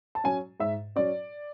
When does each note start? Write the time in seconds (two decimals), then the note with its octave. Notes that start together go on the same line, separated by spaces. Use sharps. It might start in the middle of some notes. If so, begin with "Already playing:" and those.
0.15 A5
0.24 F#3 C#4 G#5
0.60 G#2 E5
0.96 F#3 C#4 D5